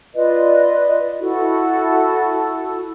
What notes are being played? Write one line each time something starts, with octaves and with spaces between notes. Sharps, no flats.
F4 B4 D5 D#5
E4 F#4 A4